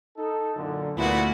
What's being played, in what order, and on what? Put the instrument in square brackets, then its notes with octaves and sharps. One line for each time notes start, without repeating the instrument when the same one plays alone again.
[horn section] D#4 A4
F#2 A#2 D3
[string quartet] D2 E4 F#4 [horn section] A#2 E3 B3